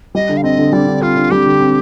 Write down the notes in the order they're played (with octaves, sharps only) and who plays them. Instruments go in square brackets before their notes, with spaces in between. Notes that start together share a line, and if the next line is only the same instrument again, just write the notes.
[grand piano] G3 [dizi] D#5
[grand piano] D3
[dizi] F5
[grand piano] C4 [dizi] D#5
[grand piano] D3
[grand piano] G3 [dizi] D5
[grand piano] D3
[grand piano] C4 [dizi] F4
[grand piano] D3
[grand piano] G3 [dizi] G4
[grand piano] D3
C4